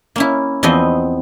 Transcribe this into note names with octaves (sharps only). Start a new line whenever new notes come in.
A#3 C#4 E4
E2 F3 B3 C4 D#5 E5